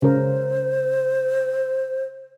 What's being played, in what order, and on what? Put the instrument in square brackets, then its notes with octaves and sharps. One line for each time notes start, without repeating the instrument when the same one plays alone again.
[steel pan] C#3 A#4 [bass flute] C5